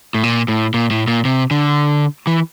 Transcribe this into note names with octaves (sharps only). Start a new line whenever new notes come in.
A2
A#2
A2
A#2
A2
A#2
C3
D3
E3